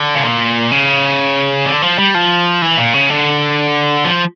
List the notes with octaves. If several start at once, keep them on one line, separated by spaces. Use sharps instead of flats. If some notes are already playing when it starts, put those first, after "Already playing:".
Already playing: D3
C#3
A#2
C#3
D3
F3
G3
F3
E3
A#2
C#3
D3
F3